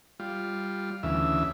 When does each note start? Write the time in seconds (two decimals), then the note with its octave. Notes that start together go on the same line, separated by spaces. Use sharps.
0.20 G3 F4
1.03 D2 C#3 E3 E5